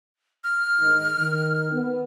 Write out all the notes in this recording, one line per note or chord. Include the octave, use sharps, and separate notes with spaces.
F6
G#2 D#3 D#4
D#3
B3